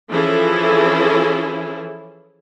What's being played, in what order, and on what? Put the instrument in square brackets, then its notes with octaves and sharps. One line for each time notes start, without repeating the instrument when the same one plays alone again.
[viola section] E3 F3 C#4 E4 G#4 A4